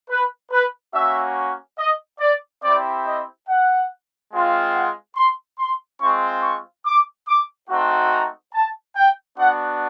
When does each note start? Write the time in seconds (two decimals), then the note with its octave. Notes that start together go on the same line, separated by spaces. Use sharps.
0.10 B4
0.51 B4
0.93 A#3 C#4 F#4 E5
1.78 D#5
2.20 D5
2.63 C4 E4 G4 D5
3.05 D#5
3.48 F#5
4.32 G#3 C4 F4
4.73 F#5
5.16 C6
5.59 C6
6.00 G#3 C4 F4 C#6
6.42 C#6
6.85 D6
7.28 D6
7.69 A3 C4 D#4 F#4
8.11 A#5
8.54 A5
8.96 G5
9.38 B3 D4 F#4 F#5